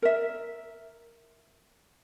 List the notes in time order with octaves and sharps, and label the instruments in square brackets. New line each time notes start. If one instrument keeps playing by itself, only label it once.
[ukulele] A#4 E5